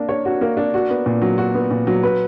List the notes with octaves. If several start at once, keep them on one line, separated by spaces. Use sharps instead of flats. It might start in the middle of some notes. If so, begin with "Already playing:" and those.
Already playing: A#3 D4
C#5
F#4
A#3
D4
F#4
B3
A#2
F#3
F#4
B3
A#2
F#3
B4